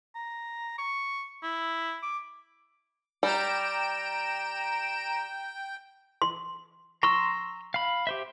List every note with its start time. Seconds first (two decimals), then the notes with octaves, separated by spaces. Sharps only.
0.15 A#5
0.78 C#6
1.43 E4
2.02 D6
3.23 G3 G5 A#5 G6 D7 E7
6.22 C6
7.03 A#5 C6 C#6 E6
7.74 F5 B5
8.07 G4 C5 E5